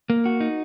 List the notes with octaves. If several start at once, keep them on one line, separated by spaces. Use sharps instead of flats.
A#3
F#4
D#4